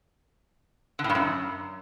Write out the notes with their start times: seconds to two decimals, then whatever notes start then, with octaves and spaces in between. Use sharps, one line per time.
0.99 D3
1.04 A2
1.10 G2
1.15 F#2